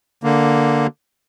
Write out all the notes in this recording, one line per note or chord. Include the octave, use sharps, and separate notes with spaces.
D3 A#3